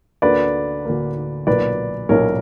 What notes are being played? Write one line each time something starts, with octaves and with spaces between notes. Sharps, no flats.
D2 D3 A#3 B4 D5
D2 D3 A#3
B1 A#2 A#3 B4 D5
B1 A#2 A#3 A#4 C#5